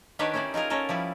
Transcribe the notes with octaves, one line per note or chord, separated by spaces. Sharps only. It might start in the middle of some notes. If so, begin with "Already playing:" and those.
D#3 D4 G4 B4 C#5
C#4 D#4 E4 C5 D5
D#4 F4 G#4 A#4
C#4 F4 A4 A#4 D#5
F3 G3 E4